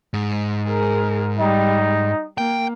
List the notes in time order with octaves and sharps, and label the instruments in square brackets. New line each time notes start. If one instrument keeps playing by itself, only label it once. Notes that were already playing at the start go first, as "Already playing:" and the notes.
[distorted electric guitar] G#2
[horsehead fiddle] G#4 A#4
[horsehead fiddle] G3 [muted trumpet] D#4
[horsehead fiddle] A#3 [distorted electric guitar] G5